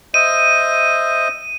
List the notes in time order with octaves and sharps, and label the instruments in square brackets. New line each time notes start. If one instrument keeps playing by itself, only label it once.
[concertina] C5 D#5 E5 [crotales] D#7